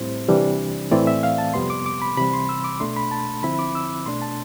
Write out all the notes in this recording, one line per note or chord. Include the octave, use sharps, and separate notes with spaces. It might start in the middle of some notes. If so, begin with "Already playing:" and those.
Already playing: A2 G3 C4 E4 C5
C3 E3 G3 D4
A2 E3 A3 C4 E4 D5
E5
F5
A5
F2 C3 G3 B3 C6
D6
D6
B5
C3 E3 G3 B5
C6
E6
D6
B2 A3 D4 C6
B5
A5
D3 F3 C4 E4 B5
D6
E6
B2 A3 D4 C6
A5